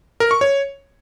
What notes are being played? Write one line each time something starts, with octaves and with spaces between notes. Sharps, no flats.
A#4
C#6
C#5